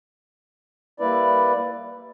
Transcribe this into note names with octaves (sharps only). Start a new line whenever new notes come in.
G3 A#3 E4 B4 D5